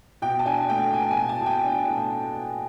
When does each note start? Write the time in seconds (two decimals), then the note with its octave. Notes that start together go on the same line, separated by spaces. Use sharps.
0.22 B2 G5
0.39 A5
0.46 D4 G#5
0.70 A3 G5
0.93 B2 G#5
1.11 G#5
1.17 B2
1.29 A5
1.41 B2
1.46 G5
1.64 D4
1.88 B2